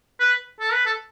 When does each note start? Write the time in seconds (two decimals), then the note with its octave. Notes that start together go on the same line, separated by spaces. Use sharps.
0.20 B4
0.60 A4
0.72 B4
0.86 A4